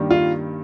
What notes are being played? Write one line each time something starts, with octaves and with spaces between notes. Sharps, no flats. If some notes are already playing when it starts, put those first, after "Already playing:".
Already playing: G2 D#3 G3 A#3
F4